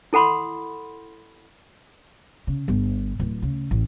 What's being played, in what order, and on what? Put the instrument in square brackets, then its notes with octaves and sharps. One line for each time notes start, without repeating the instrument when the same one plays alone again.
[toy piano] E4 A4 F#5 B5 C6
[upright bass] C#3
G1
D1
C#3
A1